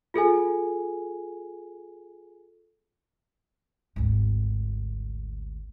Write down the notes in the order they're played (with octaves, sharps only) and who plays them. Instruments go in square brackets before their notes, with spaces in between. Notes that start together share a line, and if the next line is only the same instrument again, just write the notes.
[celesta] F4 G#4 A4 G#5
[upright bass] G#1 D2